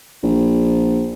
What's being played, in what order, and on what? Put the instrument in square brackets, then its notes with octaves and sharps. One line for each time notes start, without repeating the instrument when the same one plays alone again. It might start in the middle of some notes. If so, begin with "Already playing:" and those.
[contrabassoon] A#1